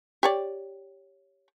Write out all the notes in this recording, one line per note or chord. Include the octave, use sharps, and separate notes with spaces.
G4 C#5 D5